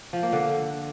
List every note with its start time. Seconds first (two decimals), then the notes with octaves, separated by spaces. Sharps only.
0.13 F3
0.23 A#3
0.33 D3